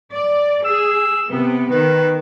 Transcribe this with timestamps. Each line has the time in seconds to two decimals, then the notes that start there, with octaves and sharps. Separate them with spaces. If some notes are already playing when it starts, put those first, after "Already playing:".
0.12 D5
0.65 G#4 E6
1.29 C3 B3
1.71 D#3 B4